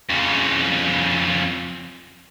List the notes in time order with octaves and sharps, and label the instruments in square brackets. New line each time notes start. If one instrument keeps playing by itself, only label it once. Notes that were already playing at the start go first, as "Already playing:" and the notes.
[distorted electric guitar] F2 C#3